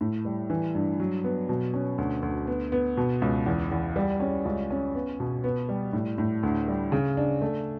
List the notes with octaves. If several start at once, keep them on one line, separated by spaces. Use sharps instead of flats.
A2
G3
E3
G2
F#3
B3
B2
C#4
D2
D2
B3
B3
B2
C#2
E2
E2
G3
C#4
C#2
C#4
B3
B2
B3
G3
A2
A2
D2
G3
C#3
D4
A3